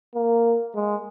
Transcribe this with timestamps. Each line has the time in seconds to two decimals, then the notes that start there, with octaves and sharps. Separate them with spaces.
0.15 A#3
0.75 G#3